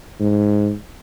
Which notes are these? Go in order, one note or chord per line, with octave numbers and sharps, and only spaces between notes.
G#2